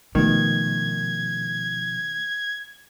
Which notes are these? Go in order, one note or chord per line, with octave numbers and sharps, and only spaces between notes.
B2 D#3 F3 A3 G#6